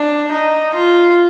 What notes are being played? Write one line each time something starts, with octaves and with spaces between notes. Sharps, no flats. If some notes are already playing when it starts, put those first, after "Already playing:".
Already playing: D4
D#4
F4